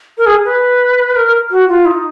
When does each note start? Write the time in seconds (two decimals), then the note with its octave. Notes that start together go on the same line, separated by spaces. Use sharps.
0.18 A#4
0.26 G#4
0.45 B4
1.16 A#4
1.51 F#4
1.68 F4
1.86 D#4